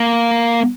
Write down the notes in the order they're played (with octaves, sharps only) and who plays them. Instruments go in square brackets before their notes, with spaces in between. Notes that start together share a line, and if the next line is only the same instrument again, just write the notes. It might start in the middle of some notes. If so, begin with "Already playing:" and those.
Already playing: [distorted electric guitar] A#3